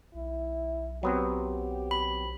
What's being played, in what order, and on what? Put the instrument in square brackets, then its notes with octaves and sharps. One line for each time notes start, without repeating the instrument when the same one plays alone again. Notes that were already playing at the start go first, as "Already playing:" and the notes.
[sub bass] B1 [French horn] E4
[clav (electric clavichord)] F#3 B3 C4 [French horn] G4
[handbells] B5